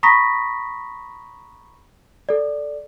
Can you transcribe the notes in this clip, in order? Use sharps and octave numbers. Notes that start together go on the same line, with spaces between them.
A#5 B5 C#6 D#6 A#6 B6
A4 D5